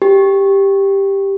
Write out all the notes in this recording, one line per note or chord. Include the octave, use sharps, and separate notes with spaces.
G4